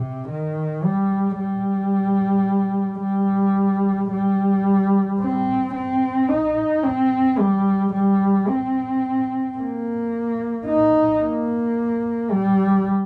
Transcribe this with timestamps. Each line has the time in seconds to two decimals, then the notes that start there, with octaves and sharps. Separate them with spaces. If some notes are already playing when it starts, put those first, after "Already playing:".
Already playing: C3
0.29 D#3
0.84 G3
1.38 G3
3.02 G3
4.11 G3
5.20 C4
5.75 C4
6.29 D#4
6.84 C4
7.39 G3
7.93 G3
8.48 C4
9.58 A#3
10.66 D#4
11.21 A#3
12.30 G3